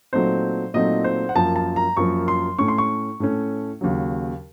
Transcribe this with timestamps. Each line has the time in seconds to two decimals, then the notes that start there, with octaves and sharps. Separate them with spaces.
0.13 A#2 F#3 A3 C4 D#4 C5
0.74 A#2 F#3 A3 C4 D#4 D#5
1.04 C5
1.29 F#5
1.35 F#2 F3 A#3 A5
1.56 A5
1.76 A#5
1.97 F#2 F3 A#3 C#6
2.28 C6
2.58 A2 A3 C#4 C#6
2.68 C6
2.78 C#6
3.20 A2 A3 C#4
3.81 D#2 C#3 F#3